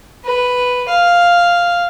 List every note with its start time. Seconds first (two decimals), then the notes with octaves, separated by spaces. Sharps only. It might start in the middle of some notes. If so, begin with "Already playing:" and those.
0.25 B4
0.89 F5